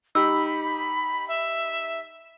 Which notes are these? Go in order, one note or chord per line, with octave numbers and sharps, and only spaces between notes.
D#4 G4 B5 E6
E5